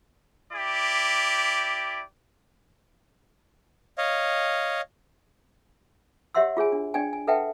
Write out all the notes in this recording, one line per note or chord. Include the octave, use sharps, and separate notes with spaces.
E4 G4 D5
C#5 D#5 F5
G4 C#5 E5 F#5 C6 E6
F4 G#4 C#5 G#5
D4
D4 D5 G5 G#5
G#5
A4 B4 E5 F#5 G5 A5